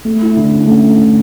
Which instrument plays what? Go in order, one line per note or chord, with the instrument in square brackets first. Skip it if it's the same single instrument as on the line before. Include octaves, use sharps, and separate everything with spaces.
[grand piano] A3
E4
D3
C#4
A3
E4
D3